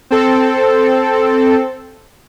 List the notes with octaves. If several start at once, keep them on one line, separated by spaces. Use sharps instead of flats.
C4 A4